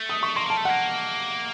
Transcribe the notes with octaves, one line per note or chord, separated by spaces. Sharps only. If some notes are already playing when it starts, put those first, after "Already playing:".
Already playing: A3
D#6
C#6
A#3 C6
A#3 A5
A3
F#5
A#3